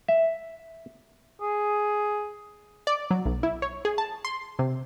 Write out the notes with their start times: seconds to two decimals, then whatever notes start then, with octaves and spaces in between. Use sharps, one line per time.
0.08 E5
1.42 G#4
2.87 D5
3.11 F#3
3.25 B1
3.43 E4
3.62 C#5
3.85 G#4
3.98 A5
4.25 C6
4.59 C3